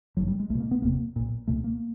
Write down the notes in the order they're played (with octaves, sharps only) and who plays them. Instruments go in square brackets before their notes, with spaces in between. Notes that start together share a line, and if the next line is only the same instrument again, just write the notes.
[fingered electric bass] G#1 G2 D3 F#3
G3
G#3
B1 A3
B2
A#3
B3
F#1 E2 C3 A#3
B1 A#2
C#2 B2 A3
A#3